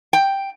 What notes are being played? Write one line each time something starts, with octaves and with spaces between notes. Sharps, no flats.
G5